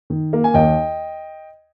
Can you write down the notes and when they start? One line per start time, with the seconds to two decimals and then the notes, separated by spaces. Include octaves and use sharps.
0.10 D#3
0.33 A#3
0.44 G#5
0.54 D#2 D#5 G5